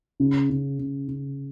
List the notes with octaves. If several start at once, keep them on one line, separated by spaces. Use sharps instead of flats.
C#3
C#3
C#3
C#3